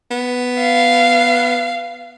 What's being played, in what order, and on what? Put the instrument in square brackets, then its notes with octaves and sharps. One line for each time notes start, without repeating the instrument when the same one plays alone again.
[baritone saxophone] B3
[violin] F5